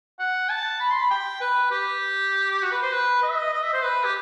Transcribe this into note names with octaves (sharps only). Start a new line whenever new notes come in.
F#5
A5
B5
C6
B5
G5
B4
G4
F#4
B4
C5
B4
D#5
E5
D#5
D#5
E5
C5
B4
G4